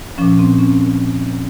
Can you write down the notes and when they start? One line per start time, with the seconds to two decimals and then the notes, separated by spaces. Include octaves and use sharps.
0.18 A#2 F3 C#4
0.39 C4
0.59 C#4